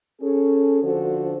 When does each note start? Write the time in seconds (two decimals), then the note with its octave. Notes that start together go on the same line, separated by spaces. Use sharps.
0.20 C#4 G#4 A4
0.82 D3 F3 D4 F#4 A4 C5